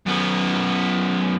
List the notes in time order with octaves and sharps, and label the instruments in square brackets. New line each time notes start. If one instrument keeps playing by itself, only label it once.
[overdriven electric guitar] F#2 B3